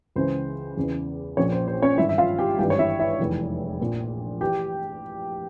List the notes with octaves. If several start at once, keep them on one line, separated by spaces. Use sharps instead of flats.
C#2 C#3 E3 C5
E2 C#3 E3
A#1 A#2 F3 C#4 C#5
C5
C5
C#4 C#5
G#1 G2 E3 E4 E5
E5
F4 F5
G4 G5
G#1 G2 E3 G4 G5
C#5
E4 E5
E4 E5
F1 E2 E3
A#1 A#2 F3
E3 G4 G5